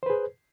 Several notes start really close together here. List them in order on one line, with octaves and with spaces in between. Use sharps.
C5 B4 G#4